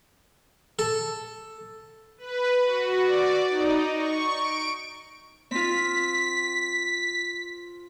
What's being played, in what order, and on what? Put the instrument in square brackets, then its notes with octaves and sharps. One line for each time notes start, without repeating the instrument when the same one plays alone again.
[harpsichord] A4
[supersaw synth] B4
F#4
D5
D#4
C#6
D7
[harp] C4 F4 [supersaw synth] B6